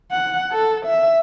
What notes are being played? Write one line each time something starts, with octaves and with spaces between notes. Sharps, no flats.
F#5
A4
E5